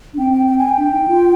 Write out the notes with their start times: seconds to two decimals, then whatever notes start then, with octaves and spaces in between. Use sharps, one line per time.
0.14 D4
0.18 C4 G5
0.33 G5
0.47 G5
0.58 G#5
0.69 G5
0.77 D4
0.92 D#4
1.08 F4